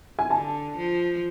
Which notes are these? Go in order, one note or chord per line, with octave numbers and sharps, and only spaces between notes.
G#5
D3 A5
F3